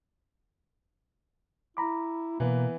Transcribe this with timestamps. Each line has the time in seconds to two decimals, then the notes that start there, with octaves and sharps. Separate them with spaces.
1.77 E4 A#5 B5 D6
2.40 B2 E3 A#3 B3